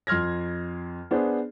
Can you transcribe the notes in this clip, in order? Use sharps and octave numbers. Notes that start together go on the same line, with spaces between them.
F2 C6 F6 G#6 A#6
B3 D4 G#4 C5